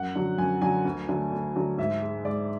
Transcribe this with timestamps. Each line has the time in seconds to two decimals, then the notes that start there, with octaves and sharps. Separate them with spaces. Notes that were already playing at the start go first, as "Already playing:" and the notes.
Already playing: F#2 F#5
0.15 D3 F#3
0.38 F#2 G#5
0.62 D3 F#3 G#5
0.85 D2
1.09 D3 F#3 A3
1.32 D2
1.55 D3 F#3 A3
1.78 G#2 E5
2.02 G#3
2.25 G#2 D5